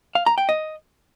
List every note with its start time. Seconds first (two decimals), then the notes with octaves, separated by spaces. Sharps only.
0.15 F5
0.26 A#5
0.38 G5
0.49 D#5